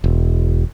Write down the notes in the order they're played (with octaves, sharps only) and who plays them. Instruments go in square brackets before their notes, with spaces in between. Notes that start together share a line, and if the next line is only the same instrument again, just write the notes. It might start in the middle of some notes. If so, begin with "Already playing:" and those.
[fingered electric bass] E1